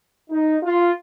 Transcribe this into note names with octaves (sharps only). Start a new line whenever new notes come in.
D#4
F4